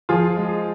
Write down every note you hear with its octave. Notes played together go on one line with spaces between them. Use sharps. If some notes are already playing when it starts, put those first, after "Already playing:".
F3 F4 G#4
G#3